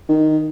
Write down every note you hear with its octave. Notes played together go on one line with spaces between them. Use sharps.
D#3